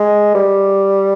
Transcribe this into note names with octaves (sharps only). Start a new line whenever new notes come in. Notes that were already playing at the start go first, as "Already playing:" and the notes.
Already playing: G#3
G3